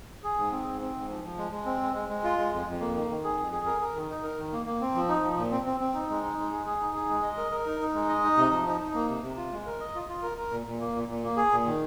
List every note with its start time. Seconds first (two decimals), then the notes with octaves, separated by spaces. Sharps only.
0.24 G#4
0.38 G#2
0.52 C4
0.67 G#2
0.81 C4
0.96 G#2
1.09 F3
1.24 F3
1.38 G#3
1.51 G#3
1.66 C4
1.81 G#3
1.94 G#3
2.09 G#3
2.24 F4
2.38 G#3
2.53 F2
2.67 F2
2.81 A#3
2.95 D#3
3.10 D#3
3.24 G#4
3.37 F2
3.52 G#4
3.66 A#4
3.81 A#4
3.95 D#3
4.09 D#4
4.23 A#4
4.38 D#3
4.53 A#3
4.66 A#3
4.81 C4
4.95 F3
5.09 D#4
5.23 F3
5.38 A#2
5.52 C4
5.66 C4
5.80 C4
5.94 D#4
6.10 G#3
6.23 D#4
6.38 G#3
6.52 G#4
6.66 G#4
6.81 D#4
6.94 G#4
7.10 G#3
7.23 D#5
7.37 A#4
7.51 A#4
7.66 D#4
7.80 D#4
7.94 G#3
8.09 D#5
8.24 D#4
8.37 C3
8.52 F3
8.67 D#4
8.80 D#4
8.94 A#3
9.09 C3
9.23 C3
9.37 F4
9.52 G#3
9.66 A#4
9.80 D#5
9.95 F4
10.08 F4
10.23 A#4
10.38 A#4
10.51 A#2
10.66 A#2
10.80 A#3
10.95 A#2
11.08 A#2
11.23 A#3
11.37 G#4
11.52 A#2
11.66 D#3